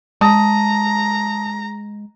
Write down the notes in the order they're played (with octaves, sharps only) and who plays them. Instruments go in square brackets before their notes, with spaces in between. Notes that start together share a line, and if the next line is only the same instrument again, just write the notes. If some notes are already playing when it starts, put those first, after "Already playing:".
[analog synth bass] G#3 [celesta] A5 [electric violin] A#5 [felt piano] D#6